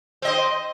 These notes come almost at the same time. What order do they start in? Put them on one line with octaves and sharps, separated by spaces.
C4 D#5 C5